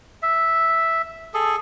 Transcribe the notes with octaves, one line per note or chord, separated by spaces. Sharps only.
E5
G#4 A4